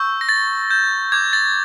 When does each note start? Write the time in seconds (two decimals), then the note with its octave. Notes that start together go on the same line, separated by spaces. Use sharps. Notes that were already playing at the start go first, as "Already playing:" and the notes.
Already playing: C#6 E6 G6
0.21 A#6
0.29 A6
0.70 G6
1.12 D6 G6 G#6
1.33 A6